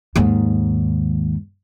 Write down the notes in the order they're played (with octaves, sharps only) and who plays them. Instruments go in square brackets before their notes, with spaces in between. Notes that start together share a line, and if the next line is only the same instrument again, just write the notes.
[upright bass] D#2 G#2